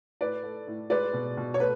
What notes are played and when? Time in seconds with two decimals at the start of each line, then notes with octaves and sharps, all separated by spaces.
0.21 A2 B4 D5
0.43 A3
0.67 A2
0.90 G#3 B4 D5
1.13 B2
1.37 B2
1.54 C#5
1.60 A3 B4